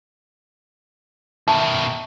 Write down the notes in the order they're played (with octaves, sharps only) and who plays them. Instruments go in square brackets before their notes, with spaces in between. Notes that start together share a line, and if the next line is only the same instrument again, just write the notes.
[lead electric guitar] B2 D#3 [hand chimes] E5 [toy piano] A5